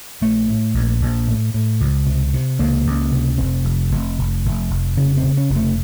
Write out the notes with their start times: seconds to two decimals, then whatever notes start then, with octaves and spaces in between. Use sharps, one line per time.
0.21 A#1 A3
0.47 A2
0.74 A#1
1.01 A#1
1.28 A2
1.54 A2
1.80 C#2
2.06 C3
2.34 C3
2.59 C#2 A#3
2.86 C#2
3.12 C3
3.38 F1 C4
3.65 F1
3.91 F1
4.18 F1
4.45 F1
4.70 F1
4.97 C#3 C#4
5.17 C4
5.23 C#3
5.37 C#4
5.50 F1
5.56 A3